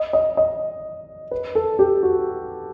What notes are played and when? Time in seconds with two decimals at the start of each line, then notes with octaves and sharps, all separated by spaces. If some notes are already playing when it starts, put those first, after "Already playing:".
Already playing: D#5
0.13 D#5
0.37 D#5
1.31 B4
1.55 A4
1.79 G4
2.03 F#4